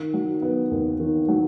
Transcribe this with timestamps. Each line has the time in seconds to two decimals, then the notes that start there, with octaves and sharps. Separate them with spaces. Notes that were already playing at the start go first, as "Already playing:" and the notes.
Already playing: D#3
0.14 F#3
0.42 B3
0.71 D#2
1.00 D#3
1.28 F#3